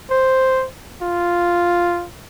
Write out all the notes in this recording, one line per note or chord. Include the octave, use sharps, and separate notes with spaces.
C5
F4